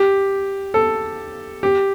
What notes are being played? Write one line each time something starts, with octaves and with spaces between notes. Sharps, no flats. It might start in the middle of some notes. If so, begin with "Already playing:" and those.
Already playing: G4
A4
G4